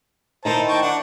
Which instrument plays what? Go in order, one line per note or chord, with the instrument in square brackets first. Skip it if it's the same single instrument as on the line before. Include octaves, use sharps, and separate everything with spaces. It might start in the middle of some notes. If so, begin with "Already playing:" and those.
[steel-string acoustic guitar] D#3 D#4 E4 [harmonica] C5 A5 A#5
[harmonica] G5 A5 C#6
D4 F#5